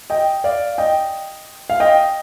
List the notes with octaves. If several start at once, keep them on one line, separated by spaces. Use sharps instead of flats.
D#5 G5
D5 F5
D#5 G5
F5
D#5 G5